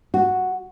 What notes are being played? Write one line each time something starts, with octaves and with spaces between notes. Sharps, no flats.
F#4